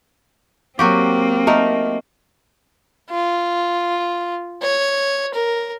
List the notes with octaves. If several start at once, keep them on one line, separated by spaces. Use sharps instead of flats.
F#3 A#3 C4 F#4 G4
A3 D#4 A#4
F4
C#5
A#4